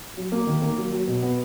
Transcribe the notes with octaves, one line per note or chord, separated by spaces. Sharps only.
F#3
A#3
D#3
A#3
F#3
F#3
B2
B3